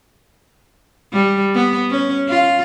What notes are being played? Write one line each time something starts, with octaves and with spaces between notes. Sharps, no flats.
G3
B3
C#4
F4